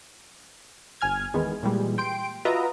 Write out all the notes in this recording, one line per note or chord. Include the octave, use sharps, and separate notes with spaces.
G1 G#5 F6 G#6
E2 D#3 E3 G#3 B3
A#2 E3 G3 G#3
G5 C6 D7
F4 F#4 B4 D#5 E5 A#5